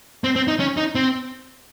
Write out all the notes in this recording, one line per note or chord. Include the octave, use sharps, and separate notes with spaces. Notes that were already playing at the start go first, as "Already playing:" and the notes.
C4
C4
D#4
C#4
D#4
C4